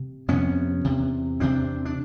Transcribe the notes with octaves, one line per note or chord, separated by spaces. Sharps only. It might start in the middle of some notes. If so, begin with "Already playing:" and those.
Already playing: C3
F2 C3 B3 C#4
E2 C3
E2 C3 C4 D4
D4